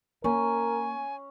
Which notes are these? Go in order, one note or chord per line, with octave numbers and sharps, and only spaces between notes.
A#3 C#4 A#4 G#5